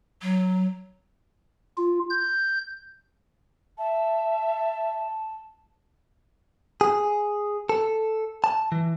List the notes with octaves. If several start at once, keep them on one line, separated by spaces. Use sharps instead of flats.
F#3
F4
G6
E5 A5
G#4
A4
A5
E3